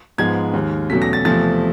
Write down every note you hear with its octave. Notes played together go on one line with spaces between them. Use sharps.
G#2 F3 G#3 B3 G#6
D#2 D#3 G#3
E2 B2 F#3 A3 C#4 B6
A#6
A6
E2 C3 F3 A3 C4 A6